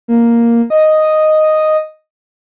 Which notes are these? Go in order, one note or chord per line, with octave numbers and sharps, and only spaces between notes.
A#3
D#5